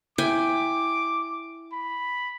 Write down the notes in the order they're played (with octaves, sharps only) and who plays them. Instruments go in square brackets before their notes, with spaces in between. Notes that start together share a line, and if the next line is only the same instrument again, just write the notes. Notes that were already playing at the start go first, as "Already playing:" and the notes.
[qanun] E4 G5 G#5 [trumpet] D6
[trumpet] B5